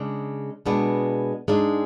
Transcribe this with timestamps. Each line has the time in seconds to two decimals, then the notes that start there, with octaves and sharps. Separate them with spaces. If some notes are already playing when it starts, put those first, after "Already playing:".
Already playing: C#3 G#3 D4
0.66 B2 G#3 B3 D4
1.48 G#2 G#3 D4